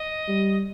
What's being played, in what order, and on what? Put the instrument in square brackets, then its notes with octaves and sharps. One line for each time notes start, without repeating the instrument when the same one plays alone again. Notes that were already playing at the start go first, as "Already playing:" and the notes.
Already playing: [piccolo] D#5
[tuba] G3